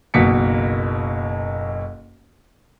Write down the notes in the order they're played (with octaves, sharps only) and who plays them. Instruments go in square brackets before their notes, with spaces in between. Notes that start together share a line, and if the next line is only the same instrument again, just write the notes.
[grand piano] F#1 B1 B2 A#3 B6 C#7